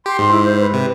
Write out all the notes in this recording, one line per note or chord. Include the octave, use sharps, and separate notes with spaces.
G4 C6
G#2
E4
C5
B4
C3